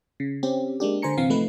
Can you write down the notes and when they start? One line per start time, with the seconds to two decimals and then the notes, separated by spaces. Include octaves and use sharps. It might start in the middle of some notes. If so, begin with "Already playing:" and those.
0.20 C#3
0.43 C4 C#4 G4
0.80 G#3 A#3 D4 G4
1.02 D3 C5 G#5 A#5 C#7
1.17 G1 C3 E3 C4 F5 C7
1.30 F3 A3 D#4 B4